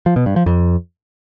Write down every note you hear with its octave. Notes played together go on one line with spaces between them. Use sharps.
F3
B2
G2
F3
F2